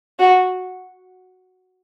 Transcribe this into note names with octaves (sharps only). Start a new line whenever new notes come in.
F#4